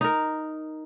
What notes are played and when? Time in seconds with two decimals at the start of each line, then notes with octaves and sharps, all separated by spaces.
0.01 D#4 A#4